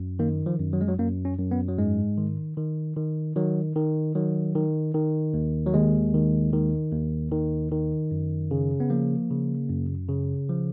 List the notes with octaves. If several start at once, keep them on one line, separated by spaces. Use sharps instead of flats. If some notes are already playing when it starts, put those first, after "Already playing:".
Already playing: F#2
D#3 A#3
F3
F#2
F#3
G#3
F#3
F#2 A#3
C#4
F#2
B3
F#3
G#2 G#3
D#3
D#3
D#3
D#3 F#3
D#3
D#3 F#3
D#3
D#3
D#2
F#3
D#2 G#3
D#3
D#3
D#2
D#3
D#3
F#2
C#3
B3
F3 A#3
C#3
F#2
C#3
F3